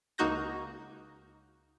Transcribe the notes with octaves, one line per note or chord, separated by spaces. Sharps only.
C#2 A#3 D#4 F#4 G6 A#6